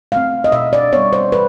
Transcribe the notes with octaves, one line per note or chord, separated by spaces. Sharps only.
A3 C4 F5
D#5
B2 E5
D5
G3 B3 C#5
C5
E3 B4